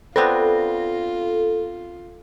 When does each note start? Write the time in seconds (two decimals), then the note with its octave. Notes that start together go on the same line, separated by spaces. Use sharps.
0.16 B3 C4 D4 F4 A4